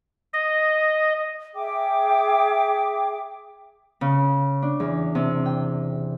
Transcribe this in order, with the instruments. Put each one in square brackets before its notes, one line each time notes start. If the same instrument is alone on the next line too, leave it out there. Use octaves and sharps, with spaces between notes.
[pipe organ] D#5
[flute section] G#4 E5 G5 D6
[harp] C#3
D4
E2
C3
G5